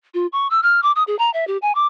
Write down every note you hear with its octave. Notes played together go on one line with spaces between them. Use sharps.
F4
C#6
E6
F6
D6
D#6
G#4
A#5
E5
G4
G#5
D6